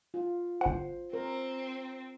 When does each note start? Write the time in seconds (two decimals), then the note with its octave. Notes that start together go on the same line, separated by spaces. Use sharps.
0.14 F4
0.61 G1 C5 F#5
1.13 C4 A#4